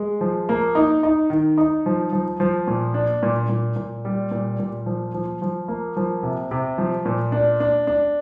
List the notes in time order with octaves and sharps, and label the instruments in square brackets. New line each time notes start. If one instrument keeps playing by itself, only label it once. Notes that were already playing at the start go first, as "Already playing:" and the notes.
Already playing: [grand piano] G#3
F3
A#3
D#4
D#4
D#3
D#4
F3
F3
F3
A#2
D4
A#2
A#2
A#2
G3
A#2
A#2
F3
F3
F3
A#3
F3
C3
C3
F3
A#2
D4
D4
D4